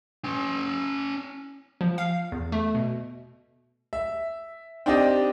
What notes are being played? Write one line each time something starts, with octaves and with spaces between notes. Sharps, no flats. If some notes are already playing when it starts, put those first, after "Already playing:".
C#4 G5
F3
F5
E2
A3
B2
E5
C4 D4 D#4 G4 D#5